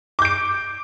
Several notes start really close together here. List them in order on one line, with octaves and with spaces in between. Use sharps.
D6 G6 D7